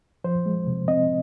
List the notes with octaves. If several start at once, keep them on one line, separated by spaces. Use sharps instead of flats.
F3 C5
G#3
C3
C4 D#5